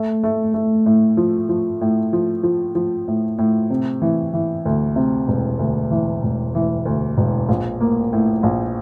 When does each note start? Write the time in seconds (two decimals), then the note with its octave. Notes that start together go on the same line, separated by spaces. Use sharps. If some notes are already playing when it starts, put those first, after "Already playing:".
Already playing: A3
0.23 A3
0.54 A3
0.86 A2
1.17 F3
1.49 F3
1.81 A2
2.13 F3
2.43 F3
2.75 F3
3.08 A2
3.38 A2
3.70 C3
4.02 E3
4.34 E3
4.65 D2
4.96 C3
5.28 E1
5.59 D2
5.91 E3
6.23 E1
6.55 E3
6.85 D2
7.18 E1
7.49 A#1
7.81 A#3
8.13 A2
8.43 A#1